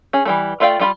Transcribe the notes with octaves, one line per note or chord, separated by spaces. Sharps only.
C#4 G#4
E3 G3 A3
A3 F4 D5 F5 G5
G3 F4 B5